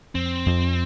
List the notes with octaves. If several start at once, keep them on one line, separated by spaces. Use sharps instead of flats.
F2 C4
F2